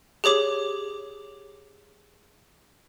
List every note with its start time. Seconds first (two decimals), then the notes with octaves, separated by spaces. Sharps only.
0.24 G4 G#4 C#5 D6